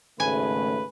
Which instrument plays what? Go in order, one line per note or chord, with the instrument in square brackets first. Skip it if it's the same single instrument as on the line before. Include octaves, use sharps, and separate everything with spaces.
[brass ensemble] G#1 C#3 A3 [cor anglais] B4 [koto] G#5